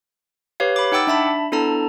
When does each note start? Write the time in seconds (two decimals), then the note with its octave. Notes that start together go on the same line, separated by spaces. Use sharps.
0.60 G4 B4 C#5 F5
0.76 B5 D6
0.92 D#4 F#5 G5 D6 E6 A6
1.07 D4 E5 A5 B5
1.52 B3 D4 E4 A4 A5 A#5